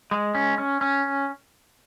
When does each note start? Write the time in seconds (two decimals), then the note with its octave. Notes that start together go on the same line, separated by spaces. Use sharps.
0.11 G#3
0.35 C#4
0.58 C#4
0.81 C#4